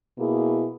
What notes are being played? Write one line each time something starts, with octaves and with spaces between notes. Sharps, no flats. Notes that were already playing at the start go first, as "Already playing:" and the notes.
B2 A#3 E4 G#4